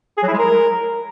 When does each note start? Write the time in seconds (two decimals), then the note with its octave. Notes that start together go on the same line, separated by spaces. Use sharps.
0.18 G#4
0.23 F#3
0.28 E4
0.33 G#3
0.38 A#4